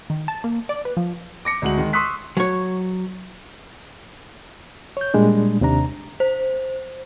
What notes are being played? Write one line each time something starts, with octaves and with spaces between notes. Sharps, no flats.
D#3
A5
A#3
D5
B4
F3
D6 A#6 C#7
D2 G#3 F#4 F#7
D#3 G#3
C6 C#6 D#6 E6 F#6 B6
F#3 C#5
C#5 G6
A#2 G3 G#3 D4
D#2 C3 D4 A#5
C5